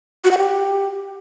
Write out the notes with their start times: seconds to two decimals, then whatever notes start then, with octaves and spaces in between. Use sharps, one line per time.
0.24 F#4
0.31 F#5
0.38 G4